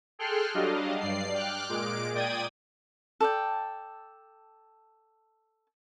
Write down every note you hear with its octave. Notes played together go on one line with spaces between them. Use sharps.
G#4 A4 G5 C6 F6 F#6
F#3 G3 D4 D#5 F5
G2 D5 C7
G5 D6 F6 F#6
A#2 G#3 D6 D7
A#2 D5 G5 D#6 G#6 D#7
A4 D5 G5